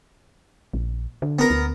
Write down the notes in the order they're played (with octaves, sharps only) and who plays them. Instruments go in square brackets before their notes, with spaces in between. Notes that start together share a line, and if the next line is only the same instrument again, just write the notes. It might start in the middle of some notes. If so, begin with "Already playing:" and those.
[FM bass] A#1
D3
[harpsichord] B3 A#4
[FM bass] D2